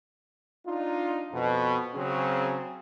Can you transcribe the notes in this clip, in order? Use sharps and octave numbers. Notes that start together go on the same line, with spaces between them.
D4 D#4 F4
F2 B2
C#3 F#3 C4 C#4 G#4